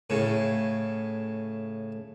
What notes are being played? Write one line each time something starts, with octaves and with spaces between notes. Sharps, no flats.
A2 C#3